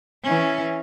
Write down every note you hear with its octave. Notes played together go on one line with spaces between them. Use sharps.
E3 C#4